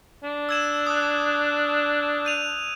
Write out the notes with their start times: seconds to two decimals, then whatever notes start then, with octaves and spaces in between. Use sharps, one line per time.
0.23 D4
0.49 E6 G#6 E7
0.87 D#6 F#6
2.25 G6 D#7 F7